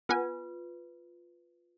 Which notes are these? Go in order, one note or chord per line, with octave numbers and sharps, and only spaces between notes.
B3 F4 B4 F#5 G#5